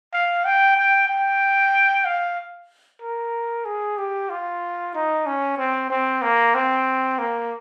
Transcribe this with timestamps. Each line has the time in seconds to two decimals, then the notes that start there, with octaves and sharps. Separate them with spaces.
0.13 F5
0.45 G5
0.77 G5
1.08 G5
2.05 F5
3.01 A#4
3.65 G#4
3.97 G4
4.29 F4
4.94 D#4
5.26 C#4
5.57 C4
5.90 C4
6.22 A#3
6.55 C4
7.19 A#3